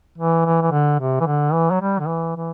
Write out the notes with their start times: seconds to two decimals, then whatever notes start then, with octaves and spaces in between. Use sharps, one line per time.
0.18 E3
0.45 E3
0.61 E3
0.71 D3
1.00 C3
1.20 E3
1.26 D3
1.53 E3
1.71 F#3
1.81 G3
1.99 D3
2.08 E3
2.36 E3